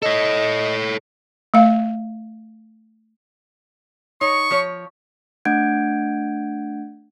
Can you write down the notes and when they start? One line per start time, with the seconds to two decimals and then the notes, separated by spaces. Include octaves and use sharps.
0.02 A4 C#5 D#5
1.54 A3 F5
4.21 D#4 C#5 C#6
4.50 F3 C#5
5.45 A3 D4 F#5 G6 G#6 D7